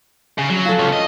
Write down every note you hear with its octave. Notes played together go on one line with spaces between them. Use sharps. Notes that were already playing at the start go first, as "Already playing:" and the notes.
C#3
F#3
F4 A4
C#2 C#4
D#5